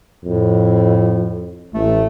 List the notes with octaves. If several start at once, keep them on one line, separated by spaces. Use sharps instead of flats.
F2 A2
A1 A3